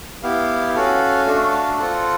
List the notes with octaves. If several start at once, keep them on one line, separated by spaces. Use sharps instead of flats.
B3 E4 G4 F5
C#4 F#4 A4 F5
A3 D4 F#4 A4
C4 F4 A4 F#5